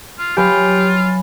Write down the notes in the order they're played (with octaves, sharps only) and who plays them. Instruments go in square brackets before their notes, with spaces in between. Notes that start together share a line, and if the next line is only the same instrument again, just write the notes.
[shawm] F4
[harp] F#3 [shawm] F4 [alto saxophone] G4 [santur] B4 F5 G#5